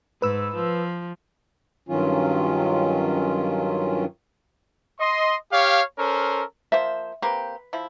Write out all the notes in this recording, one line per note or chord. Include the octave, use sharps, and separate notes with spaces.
G#2 B4 E6
F3
G2 D#3 F#3 C#4 F4
D#5 C6
G4 C#5 F5
C#4 A4 A#4 C5
F3 A#3 C5 E5
A#3 C4 G4 B4
F3 E4